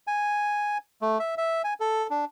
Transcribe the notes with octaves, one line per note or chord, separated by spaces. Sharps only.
G#5
A3
E5
E5
G#5
A4
D4